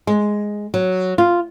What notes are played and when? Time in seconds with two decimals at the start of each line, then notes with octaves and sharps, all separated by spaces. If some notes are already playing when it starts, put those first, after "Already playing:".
0.07 G#3
0.74 F#3
1.18 F4